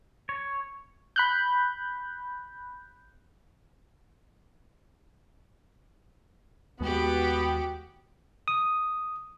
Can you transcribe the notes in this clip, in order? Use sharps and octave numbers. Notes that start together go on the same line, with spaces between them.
C#5
B5 F#6 G6
D#2 G#3 B3 F#4 G4
D#6